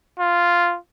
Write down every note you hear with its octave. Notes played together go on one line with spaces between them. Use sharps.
F4